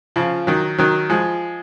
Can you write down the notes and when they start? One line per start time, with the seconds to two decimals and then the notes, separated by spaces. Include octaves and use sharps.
0.16 C#3 F3
0.47 D#3 F#3
0.78 D#3 F#3
1.10 F3 G#3